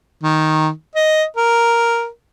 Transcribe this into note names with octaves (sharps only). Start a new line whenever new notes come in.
D#3
D#5
A#4